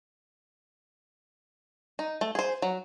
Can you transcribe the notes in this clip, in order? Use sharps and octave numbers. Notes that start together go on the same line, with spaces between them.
D#4
A3
G#4 C5
F#3